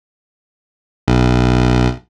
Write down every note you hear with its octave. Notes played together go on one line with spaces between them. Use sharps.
B1